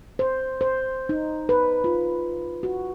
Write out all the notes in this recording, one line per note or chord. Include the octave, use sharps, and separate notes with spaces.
C5
C5
D#4
B4
F4
F#4